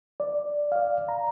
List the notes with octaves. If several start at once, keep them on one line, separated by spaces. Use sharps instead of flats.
D5
D5 F5
A#5